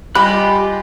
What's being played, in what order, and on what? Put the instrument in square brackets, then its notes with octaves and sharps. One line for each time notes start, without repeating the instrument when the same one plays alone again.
[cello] G3 F4 [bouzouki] G4 [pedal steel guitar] D#5 G#5 F#6 [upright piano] B5